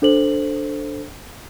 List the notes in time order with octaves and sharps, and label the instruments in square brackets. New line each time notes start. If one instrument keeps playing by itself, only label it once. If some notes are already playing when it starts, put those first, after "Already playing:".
[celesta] D4 A4 C5 F#7